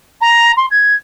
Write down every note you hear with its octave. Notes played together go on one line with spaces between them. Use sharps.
A#5
C6
G#6